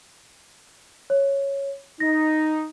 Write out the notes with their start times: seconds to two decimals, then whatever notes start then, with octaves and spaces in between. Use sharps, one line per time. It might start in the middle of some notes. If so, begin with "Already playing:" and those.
1.10 C#5
2.00 D#4 A#6